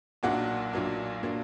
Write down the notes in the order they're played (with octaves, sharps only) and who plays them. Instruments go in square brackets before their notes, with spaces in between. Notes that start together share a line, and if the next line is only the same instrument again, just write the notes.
[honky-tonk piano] B1 A#2 F#3 A#3 D4 F#5
B1 A#2 F#3 A#3 D4
A#2 F#3 A#3 D4